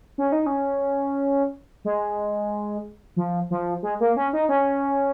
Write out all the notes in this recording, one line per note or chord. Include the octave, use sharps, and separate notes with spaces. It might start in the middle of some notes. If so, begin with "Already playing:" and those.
C#4
D#4
C#4
G#3
F3
F3
G#3
A#3
C#4
D#4
C#4